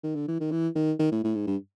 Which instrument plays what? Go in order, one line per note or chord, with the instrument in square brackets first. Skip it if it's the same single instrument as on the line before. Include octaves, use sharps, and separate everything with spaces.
[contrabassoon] D#3
D3
E3
D#3
E3
D#3
D#3
A2
A2
G#2
G2